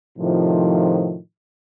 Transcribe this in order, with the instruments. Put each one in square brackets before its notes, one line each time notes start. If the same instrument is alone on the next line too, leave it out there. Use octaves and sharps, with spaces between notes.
[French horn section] A2 C3 D#3 F3